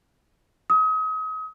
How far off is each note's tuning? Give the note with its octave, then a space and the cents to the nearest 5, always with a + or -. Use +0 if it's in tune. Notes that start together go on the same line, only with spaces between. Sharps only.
D#6 +35